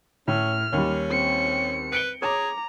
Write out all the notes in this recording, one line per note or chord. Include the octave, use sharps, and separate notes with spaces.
A2 C#4 F6
D#2 G3 C#4
C4 C#7
B4 C#7 D7 G7
G#4 C#5 A#5 D6